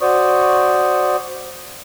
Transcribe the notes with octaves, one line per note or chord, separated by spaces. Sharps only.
F#4 C5 D5 C#6 D#6